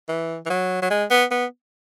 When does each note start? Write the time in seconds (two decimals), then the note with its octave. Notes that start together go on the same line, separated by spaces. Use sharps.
0.09 E3
0.46 E3
0.50 F#3
0.82 F#3
0.90 G#3
1.10 B3
1.31 B3